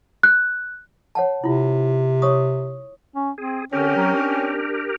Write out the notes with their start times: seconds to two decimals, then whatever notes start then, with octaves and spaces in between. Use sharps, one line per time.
0.23 F#6
1.15 C#5 F#5 A5
1.44 C3 E4 F4
2.22 C#5 C#6 D#6
3.15 C#4
3.38 C4 G#4
3.73 D3 C4 C#4 G4 A#4
3.96 F#3
4.15 D4